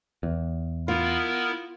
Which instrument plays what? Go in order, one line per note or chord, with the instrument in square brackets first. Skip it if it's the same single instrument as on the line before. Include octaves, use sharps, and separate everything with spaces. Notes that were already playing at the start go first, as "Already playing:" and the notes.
[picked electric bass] E2
[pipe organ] B3 E4 A#4 [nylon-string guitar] F4